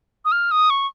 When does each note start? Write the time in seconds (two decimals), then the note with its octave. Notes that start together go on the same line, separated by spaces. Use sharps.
0.25 D#6
0.32 F6
0.51 D#6
0.70 C#6